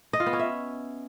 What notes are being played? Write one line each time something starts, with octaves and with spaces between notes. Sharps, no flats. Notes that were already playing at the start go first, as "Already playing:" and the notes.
D#5
F4
B3
C#4
E5